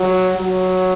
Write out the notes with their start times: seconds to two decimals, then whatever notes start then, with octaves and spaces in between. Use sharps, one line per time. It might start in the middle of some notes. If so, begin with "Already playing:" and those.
Already playing: F#3
0.37 F#3